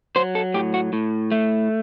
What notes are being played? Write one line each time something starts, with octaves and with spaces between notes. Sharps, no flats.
F#3 C5
A4
A2 G4
F#4
A2
A3